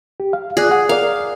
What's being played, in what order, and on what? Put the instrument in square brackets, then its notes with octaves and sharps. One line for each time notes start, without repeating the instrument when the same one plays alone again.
[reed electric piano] G4
F5
[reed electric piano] F4 D5 F#6 [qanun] G#4
[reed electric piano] F#5
[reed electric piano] A#4 D5 [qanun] F5